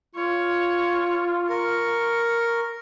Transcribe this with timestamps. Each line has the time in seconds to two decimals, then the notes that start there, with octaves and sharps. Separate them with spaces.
0.15 F4 C#5
1.49 A#4 C#6